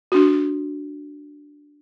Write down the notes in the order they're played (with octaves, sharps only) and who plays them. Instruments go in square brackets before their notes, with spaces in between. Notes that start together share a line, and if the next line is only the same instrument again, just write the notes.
[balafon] D4 F#4